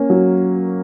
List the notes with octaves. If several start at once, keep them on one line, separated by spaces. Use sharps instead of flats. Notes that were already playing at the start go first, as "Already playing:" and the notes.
Already playing: A#3 C#4
F#3